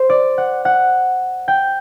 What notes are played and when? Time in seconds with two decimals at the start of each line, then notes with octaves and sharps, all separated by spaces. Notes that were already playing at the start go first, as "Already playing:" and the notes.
Already playing: C5
0.10 D5
0.38 F#5
0.65 F#5
1.48 G5